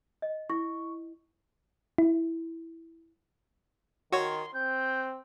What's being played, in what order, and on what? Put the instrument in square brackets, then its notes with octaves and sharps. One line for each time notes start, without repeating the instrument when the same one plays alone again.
[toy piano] D#5
[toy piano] E4 [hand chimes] C#6
[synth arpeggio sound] E4
[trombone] D#3 [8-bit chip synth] F#4 C#5 [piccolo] C6
[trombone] C4 [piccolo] G6